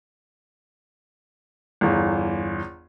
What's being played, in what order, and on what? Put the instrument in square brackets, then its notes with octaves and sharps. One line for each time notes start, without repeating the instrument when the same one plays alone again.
[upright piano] G1 E2